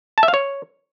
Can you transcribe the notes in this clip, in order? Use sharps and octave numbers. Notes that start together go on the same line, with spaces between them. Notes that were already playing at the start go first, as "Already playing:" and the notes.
A5
E5
F5
C#5